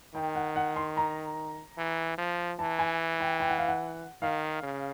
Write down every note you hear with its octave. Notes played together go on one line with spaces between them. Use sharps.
D#3 G5
F#5
F#5
C6
A#5
E3
F3
E3 A5
G#5
G5
G5
F#5
F5
F#5
D#3 F5
C#3